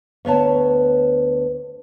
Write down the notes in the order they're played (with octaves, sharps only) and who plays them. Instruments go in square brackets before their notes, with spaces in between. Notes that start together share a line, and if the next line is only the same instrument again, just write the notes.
[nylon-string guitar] D2 B3 C#5 A5